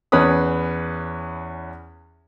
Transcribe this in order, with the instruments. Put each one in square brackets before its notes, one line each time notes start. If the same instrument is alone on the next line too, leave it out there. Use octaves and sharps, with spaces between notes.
[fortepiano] E2 C#4 B4 B5 D#6